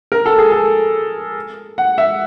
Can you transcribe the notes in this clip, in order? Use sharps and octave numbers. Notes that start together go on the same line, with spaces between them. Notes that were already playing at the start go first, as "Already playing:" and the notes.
A#4
A4
G#4
A4
F#5
E5